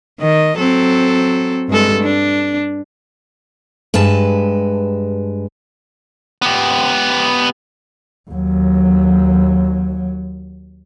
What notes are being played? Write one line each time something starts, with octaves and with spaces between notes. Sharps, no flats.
D#3 D#5
F#3 C4 A4
G2 G#3 A4
D4
G2 G#3 B4 A5
B3 G4
D#2 F#3